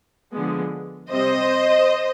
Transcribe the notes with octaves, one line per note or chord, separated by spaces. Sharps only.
D3 F3 G#3 B3
C3 G3 C4 C5 D#5